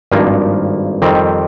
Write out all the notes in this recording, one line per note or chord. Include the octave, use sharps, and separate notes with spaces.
G#1 G2 F3 A#3
F2 D#3 G3 C4